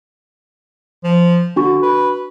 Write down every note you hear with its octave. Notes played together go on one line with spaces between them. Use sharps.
F3
D3 D4 F#4 C#6
B4